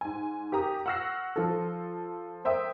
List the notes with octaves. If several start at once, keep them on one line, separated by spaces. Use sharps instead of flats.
G#2 G#5
G4 A#4 A#5 D#6
F#5 C#6 E6 F6 A#6 C7
F3 A4
A#4 C5 E5 G5 D#6